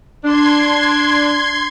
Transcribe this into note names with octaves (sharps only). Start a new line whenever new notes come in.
D4 C6 G#6